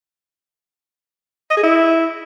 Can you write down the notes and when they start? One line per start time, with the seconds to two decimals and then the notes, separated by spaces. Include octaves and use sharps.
1.50 D#5
1.57 G#4
1.63 E4